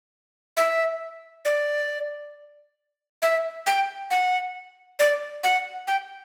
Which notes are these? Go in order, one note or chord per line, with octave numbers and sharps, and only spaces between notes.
E5
D5
E5
G5
F#5
D5
F#5
G5